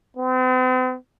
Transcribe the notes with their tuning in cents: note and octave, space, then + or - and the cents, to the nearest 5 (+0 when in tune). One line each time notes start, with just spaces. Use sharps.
C4 -45